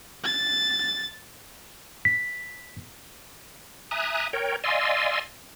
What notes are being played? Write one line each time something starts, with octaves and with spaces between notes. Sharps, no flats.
A6
B6
E5 G#5 A#5 D#6 F#6
A#4 C#5 G5
D5 D#5 F5 G#5 C6 E6